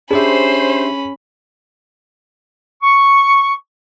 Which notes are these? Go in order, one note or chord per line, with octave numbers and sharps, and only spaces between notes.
C#4 D4 G4 G#4 C5 E5 B5
C#6